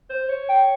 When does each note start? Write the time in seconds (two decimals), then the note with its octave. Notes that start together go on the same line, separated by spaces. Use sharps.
0.10 C5
0.29 C#5
0.49 G5